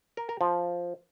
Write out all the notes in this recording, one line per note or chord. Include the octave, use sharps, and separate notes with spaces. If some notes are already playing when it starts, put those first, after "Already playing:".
A#4
A#4
F3